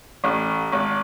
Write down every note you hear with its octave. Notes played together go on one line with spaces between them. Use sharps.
A1
G#1